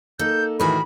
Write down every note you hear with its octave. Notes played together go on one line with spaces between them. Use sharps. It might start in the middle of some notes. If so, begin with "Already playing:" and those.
A#3 D#4 A4 G6
A2 D#3 E3 F#4 G#4 A#4 B5